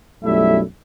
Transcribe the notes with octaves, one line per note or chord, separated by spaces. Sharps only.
B1 F#2 G3 A3 E4 E5